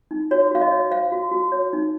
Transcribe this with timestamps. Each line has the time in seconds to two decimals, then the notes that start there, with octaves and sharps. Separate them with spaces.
0.11 D#4
0.31 F#4 C#5
0.51 F#4 F5
0.61 D#5
0.71 C#5
0.91 C5 F5
1.12 F#4
1.31 F#4
1.52 C#5
1.73 D#4